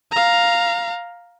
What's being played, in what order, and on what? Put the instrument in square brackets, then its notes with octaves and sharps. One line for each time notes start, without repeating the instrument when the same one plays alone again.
[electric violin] F5 A#5